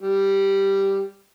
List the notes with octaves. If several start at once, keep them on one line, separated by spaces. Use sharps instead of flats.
G3